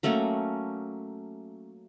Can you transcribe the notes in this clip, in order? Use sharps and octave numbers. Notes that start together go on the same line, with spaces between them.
F#3 A3 A#3 C#4